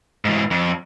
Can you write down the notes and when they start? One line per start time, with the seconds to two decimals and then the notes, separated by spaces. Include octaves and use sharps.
0.25 G#2 E3
0.51 F2